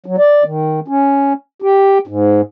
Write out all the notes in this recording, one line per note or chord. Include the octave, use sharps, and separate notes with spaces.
F#3
D5
D#3
C#4
G4
G#2